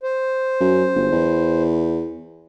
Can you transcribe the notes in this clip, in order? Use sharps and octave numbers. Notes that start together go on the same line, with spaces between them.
C5
F#2
G1
E2